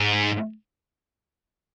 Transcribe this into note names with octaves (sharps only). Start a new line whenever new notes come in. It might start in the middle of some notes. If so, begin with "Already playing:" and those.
Already playing: G#2